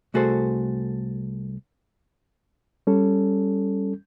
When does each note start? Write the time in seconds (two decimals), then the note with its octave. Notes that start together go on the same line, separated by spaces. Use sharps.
0.14 C2 A3 F#4 G#4 A4 C5
2.87 G3 C#4 A4